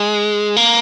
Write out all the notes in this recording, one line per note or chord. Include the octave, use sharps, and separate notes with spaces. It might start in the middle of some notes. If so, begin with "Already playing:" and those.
Already playing: G#3
A#3